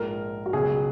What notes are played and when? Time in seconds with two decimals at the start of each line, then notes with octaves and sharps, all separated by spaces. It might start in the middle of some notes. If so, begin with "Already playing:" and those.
Already playing: A#1 G#2 F3 G#3 A#4
0.46 F#4
0.53 C#2 B2 F#3 G#4